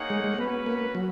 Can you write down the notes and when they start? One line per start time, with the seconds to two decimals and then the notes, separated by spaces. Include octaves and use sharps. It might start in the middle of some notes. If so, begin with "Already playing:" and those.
Already playing: A#3 D#4 G#4 C#5 F#5
0.10 G#3
0.24 G#3
0.38 B3 C#4 F#4 B4
0.66 A#3
0.95 F#3